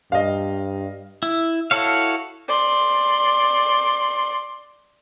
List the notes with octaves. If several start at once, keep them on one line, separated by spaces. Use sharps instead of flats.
G2 D#5 F5
E4
E4 F#4 A4 C#5 F5
D5 C6